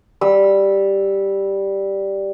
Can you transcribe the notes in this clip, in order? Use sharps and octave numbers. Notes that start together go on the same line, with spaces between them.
G3 E6